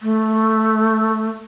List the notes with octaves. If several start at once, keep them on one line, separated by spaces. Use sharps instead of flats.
A3